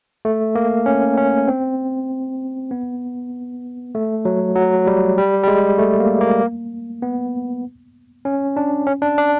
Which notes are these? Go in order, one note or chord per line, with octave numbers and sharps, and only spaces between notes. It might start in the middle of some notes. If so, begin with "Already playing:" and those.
A3
A#3
C#4
C#4
C4
B3
A3
F#3
F#3
G3
G3
G3
G#3
A3
A#3
A#3
B3
C#4
D4
C#4
D4
D4